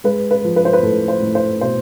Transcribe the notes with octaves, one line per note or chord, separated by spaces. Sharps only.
G#3 B4
B4
F3
B4
C5
B4
A2 A4
C5
A2
C5
B2 C5